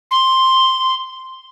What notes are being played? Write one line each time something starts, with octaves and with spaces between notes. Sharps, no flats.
C6